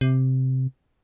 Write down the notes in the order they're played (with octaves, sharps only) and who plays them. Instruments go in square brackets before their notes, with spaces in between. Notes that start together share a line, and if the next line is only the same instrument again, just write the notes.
[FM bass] C3